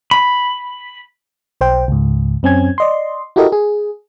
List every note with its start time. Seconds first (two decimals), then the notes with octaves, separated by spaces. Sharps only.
0.11 B5
1.61 B1 C5 G5
1.88 C#2 G#2
2.43 F#2 C4 C#4 G#5 G#6
2.78 D5 D#5 C6
3.36 E4 F#4 G4 A4 A#4 D#5
3.52 G#4